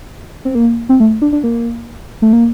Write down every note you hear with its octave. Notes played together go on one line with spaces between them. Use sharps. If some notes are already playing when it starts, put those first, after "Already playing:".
C4
A#3
C4
A3
D4
D4
A#3
A3
A#3